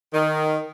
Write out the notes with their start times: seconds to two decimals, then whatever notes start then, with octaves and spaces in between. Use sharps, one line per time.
0.13 D#3